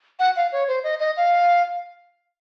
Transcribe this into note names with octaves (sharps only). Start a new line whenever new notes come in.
F#5
F5
C#5
C5
D#5
D#5
F5